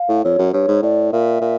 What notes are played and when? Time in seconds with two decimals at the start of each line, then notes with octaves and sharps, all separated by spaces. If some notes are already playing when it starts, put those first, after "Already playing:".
Already playing: F5
0.09 A2
0.24 F2 C#5
0.38 F#2
0.53 G2 C#5
0.68 G#2
0.82 A2 D5
1.12 A#2 E5
1.41 A#2